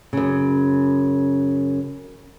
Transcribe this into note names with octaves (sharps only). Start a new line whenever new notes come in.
F#2 C#3